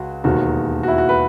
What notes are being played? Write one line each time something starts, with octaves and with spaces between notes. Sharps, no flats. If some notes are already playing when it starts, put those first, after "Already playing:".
Already playing: C#2 F#4
E1 D#2 D#3 F#4
F#4
E4
F#4
B4